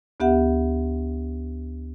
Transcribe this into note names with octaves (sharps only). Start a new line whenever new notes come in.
D2 B3 G4 E5 F#5